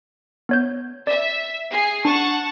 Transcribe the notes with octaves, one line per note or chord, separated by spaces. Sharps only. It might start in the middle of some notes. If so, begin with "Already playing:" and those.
B3 C#5 G6
D5 E5
G#4 C7
D4 F#5 A5 C#6